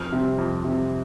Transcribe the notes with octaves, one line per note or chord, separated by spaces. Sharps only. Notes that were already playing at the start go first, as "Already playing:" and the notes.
Already playing: F2 F6
C3 G3 C4
F2
C3 G3 C4